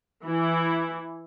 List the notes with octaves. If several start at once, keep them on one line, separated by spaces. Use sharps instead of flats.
E3 E4